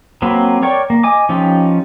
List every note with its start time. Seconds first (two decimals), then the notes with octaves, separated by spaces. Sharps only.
0.22 F#3 A#3 C4 B4
0.62 A#4 C#5 D5 G5 C#6
0.90 A#3
1.03 D#5 G#5 D6
1.29 F3 C#4 D#4 F4 G4